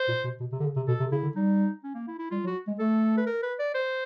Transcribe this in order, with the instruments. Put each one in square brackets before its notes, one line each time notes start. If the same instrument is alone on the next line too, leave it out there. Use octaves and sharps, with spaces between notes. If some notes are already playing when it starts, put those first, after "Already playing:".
Already playing: [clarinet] C5
[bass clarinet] A#2
B2
B2
C3
D3
C#3
C3
[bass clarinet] B2 [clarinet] A4
[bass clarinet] C3
[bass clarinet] C#3 [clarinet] E4
[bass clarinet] D3
[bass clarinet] G3 [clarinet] D#4
[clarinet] C#4
A#3
E4
E4
[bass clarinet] G3 [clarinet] F4
[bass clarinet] F#3
[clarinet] F#4
[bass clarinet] G#3
[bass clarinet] A3 [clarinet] A4
[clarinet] B4
A#4
B4
D5
C5